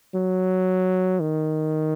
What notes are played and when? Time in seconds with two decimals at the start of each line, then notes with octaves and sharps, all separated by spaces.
0.15 F#3
1.20 D#3